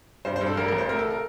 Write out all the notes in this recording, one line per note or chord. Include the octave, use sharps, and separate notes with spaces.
G2 C5
C5
G2
A4
A1 A#4
A1 A#4
C5
A3 A#4
A4
A#4